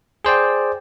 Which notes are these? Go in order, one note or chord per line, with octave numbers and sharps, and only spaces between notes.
G#4 C5 D5 G5